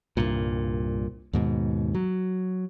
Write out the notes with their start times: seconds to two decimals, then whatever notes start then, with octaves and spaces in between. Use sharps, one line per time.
0.17 C2 G2 A#2
1.33 D#2 G#2 B2
1.94 F#3